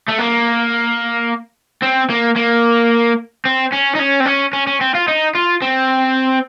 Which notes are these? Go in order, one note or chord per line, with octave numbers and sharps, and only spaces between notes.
A3
A#3
C4
A#3
A#3
C4
C#4
D#4
C#4
C4
C#4
C#4
C#4
C4
F4
D#4
F4
C4